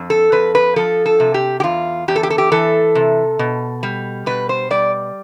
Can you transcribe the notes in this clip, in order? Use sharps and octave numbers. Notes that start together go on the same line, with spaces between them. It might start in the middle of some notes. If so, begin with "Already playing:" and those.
Already playing: F2
A4
F2 B4
B4
F3 A4
A4
C3
G4
G4
E2 F4
E2 G4
A4
G4
A4
G4
E3 A4
C3
B2
G3
B2 B4
C5
G3 D5